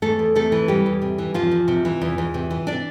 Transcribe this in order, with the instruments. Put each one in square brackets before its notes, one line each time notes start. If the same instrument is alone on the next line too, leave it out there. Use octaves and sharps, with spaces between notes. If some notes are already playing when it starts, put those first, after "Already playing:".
[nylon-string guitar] E2 A3 A4
E2
C3 A3 A4
E3
E2 G3 G4
E2
C3
E3
E2 F3 F4
E2
C3
E3
E2
E2
C3
E3
D4 D5